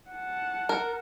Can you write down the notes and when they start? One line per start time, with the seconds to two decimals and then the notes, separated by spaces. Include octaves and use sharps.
0.10 F#5 A5
0.69 A#4